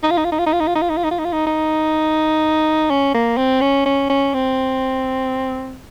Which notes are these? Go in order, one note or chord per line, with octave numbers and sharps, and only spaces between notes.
D#4
F4
D#4
F4
D#4
F4
D#4
F4
D#4
F4
D#4
F4
D#4
F4
D#4
F4
D#4
F4
D#4
D#4
C#4
A#3
C4
C#4
C#4
C#4
C4